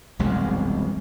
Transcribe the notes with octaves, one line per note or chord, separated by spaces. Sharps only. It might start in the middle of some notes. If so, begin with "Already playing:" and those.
E1 C2 F#2 G#3